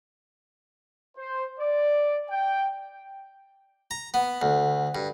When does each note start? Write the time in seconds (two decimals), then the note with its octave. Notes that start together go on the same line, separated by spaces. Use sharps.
1.17 C5
1.60 D5
2.30 G5
3.91 A#5
4.14 B3
4.42 D2
4.95 G2